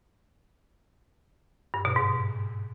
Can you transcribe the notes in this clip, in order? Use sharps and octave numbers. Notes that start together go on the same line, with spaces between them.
G2
B2
G#2